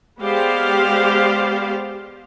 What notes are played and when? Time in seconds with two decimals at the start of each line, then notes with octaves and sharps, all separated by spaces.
0.19 G#3 B3 G4 C5 D5 F5